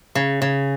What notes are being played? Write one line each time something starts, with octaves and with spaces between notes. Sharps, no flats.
C#3
C#3